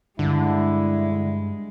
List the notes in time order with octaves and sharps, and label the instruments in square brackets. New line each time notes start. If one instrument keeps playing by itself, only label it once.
[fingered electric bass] G2 [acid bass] D3 [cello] G#3 [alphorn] E4